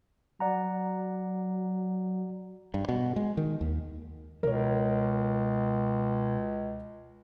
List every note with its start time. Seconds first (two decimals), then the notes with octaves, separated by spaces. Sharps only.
0.40 F#3 D5 F#5 A#5
2.74 G2
2.89 B2
3.16 G#3
3.37 D#3
3.61 D#2
4.43 C#2 B2 A#4 C#5